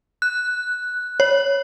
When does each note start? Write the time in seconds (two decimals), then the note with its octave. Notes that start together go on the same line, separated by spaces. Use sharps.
0.22 F#6
1.20 C#5